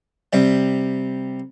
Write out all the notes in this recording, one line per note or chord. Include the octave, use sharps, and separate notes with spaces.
C3 G3